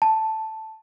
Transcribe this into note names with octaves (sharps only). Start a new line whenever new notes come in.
A5